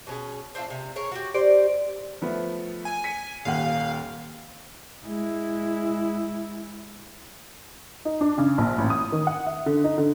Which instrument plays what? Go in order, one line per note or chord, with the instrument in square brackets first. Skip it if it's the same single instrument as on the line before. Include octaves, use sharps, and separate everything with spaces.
[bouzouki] B2 C#4 G#4
C4 D4 E4 F4
C3
G#4 A#4 C#5
F#4 G4
G4 C5 D5
[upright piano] F3 A3 B3
[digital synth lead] G#5
[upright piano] B6 C#7 D#7
[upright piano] D#1 D#2 F#5 [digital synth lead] F5
[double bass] G#3 E4
[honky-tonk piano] D#4
D4
C#3
A#1
A1
D#6
D#3
F#5
E5
D3
D#4
D3